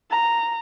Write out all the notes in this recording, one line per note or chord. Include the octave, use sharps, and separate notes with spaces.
A#5